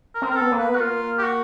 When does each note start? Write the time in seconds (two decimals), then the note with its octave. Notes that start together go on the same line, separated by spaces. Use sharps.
0.15 A#4
0.22 C4
0.31 A#4
0.37 B3 A4
0.51 A#3
0.59 B4
0.69 B3
0.76 F#4
0.80 A#3 F4
1.19 G4
1.23 F#4